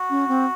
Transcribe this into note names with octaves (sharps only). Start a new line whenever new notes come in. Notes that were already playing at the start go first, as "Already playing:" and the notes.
Already playing: F#4
C#4
C4